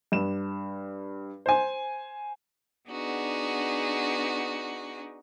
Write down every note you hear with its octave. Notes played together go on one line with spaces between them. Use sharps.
G2 E7
C5 G#5
B3 D4 D#4 F#4 G#4